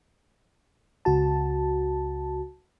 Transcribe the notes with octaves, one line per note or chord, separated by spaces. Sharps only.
C#2 F#4 A5